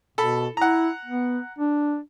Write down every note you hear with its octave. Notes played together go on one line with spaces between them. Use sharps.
B2 A4 B5
E4 F#5 A#5
B3
D4